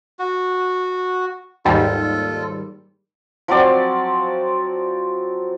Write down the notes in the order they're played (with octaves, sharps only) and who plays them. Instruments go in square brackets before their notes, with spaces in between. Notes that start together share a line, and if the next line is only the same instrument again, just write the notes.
[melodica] F#4
[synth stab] D#2 G#2 G3 [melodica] F4 A4
[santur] F3 F#3 C4 D5